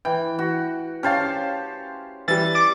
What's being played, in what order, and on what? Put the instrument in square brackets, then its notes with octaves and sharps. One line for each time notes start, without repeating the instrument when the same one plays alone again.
[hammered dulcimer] E3 [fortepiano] G5
[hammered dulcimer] F#4
[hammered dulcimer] C#4 C5 A5 [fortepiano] G4 F5
[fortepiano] E3 G3 [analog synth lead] A6
[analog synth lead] D6